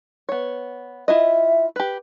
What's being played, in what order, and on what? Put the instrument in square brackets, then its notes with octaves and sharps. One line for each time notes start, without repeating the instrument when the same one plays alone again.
[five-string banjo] B3 C#5
[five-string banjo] E4 F4 D#5 [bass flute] E5
[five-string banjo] G4 B4